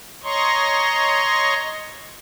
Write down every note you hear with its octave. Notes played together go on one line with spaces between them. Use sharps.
C#5 D#5 A#5 C6 C#6